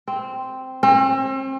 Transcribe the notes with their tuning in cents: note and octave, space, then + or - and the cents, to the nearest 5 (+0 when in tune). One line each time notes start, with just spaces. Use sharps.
C4 -5
C4 +40